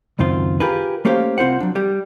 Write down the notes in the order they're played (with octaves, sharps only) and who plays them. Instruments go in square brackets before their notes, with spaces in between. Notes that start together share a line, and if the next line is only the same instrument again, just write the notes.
[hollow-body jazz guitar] C#2 F#2 D#3 C4 F4
F4 G4 G#4 A#4 B4
A3 A#3 C#4 G4 C5 F5
C2 C4 F4 C5 F#5
F#3 D4
G3 G4